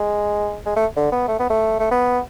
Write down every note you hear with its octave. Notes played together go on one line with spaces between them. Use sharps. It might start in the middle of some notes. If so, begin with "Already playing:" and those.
Already playing: G#3
G#3
A3
D3
B3
A3
B3
A3
A3
B3